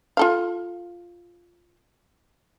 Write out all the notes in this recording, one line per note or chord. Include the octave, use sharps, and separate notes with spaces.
F4 A4 F5